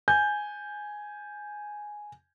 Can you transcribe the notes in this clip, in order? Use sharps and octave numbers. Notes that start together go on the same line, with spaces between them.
G#5 G6